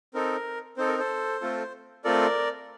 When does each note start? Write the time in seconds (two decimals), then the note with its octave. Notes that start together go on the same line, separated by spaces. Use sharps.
0.14 C4 D#4 A4 A#4
0.77 C4 D#4 A4 C5
0.88 A#4
0.99 A4 C5
1.41 A3 C4 F4 A4
2.04 A3 C4 F4 A4 A#4 D5